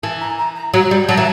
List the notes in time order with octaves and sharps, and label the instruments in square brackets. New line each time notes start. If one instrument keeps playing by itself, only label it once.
[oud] E3 [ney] A5
[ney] A#5
A#5
A#5
[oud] F#3 [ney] A#5
[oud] G3
[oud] F#3 [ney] A5
[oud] E3 [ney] A#5